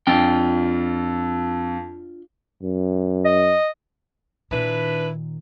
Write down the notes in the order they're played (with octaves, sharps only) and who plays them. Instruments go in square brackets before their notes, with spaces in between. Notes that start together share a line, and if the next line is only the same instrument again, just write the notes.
[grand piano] F2 [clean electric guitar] D4 F4 G5
[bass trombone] F#2
[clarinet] D#5
[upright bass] A#2 D#3 [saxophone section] D4 E4 B4